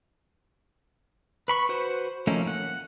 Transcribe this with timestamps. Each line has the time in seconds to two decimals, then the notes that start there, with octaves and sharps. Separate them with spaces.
1.48 B4 B5 C#6
1.69 F#4 B4 C5
2.27 F3 A3 A#3 C#4 D#4
2.47 F#5